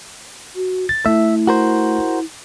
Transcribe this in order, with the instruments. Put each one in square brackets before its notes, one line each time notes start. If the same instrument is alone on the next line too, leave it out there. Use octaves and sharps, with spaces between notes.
[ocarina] F#4
[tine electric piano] A6
[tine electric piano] A3 [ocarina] E4 [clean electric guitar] E5
[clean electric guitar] F#4 A#4 C5